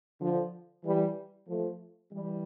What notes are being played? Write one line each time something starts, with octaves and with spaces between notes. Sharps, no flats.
D3 F3
E3 G3
F3 A3
E3 G3